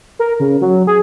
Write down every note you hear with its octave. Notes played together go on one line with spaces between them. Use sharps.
A#4
C#3
F#3
G#4